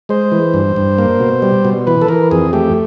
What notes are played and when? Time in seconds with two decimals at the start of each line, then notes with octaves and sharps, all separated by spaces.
0.09 G#3 C5
0.32 E3
0.54 G2
0.76 G2
0.98 A#3
1.20 B2
1.42 G3
1.65 B2
1.87 E3 B4
2.02 A4
2.08 E3 A#4
2.31 F2 G#4
2.53 A3 G4